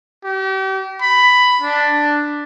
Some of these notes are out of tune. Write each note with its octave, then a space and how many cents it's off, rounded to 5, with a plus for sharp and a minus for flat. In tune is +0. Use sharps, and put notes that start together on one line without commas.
G4 -40
B5 +10
D4 +5